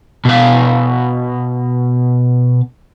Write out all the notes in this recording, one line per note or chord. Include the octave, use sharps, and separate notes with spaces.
B2 F5